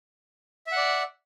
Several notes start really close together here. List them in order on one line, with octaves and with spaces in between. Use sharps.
E5 F#5 D5